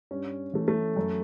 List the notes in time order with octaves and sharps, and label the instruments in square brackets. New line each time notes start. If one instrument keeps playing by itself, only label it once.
[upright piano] G2 C#4
E3 A3
A3
F#2